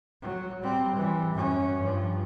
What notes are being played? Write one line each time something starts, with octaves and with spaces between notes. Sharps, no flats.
F#3
G3 C4
E3 G3
F#2 C#4
G2 F3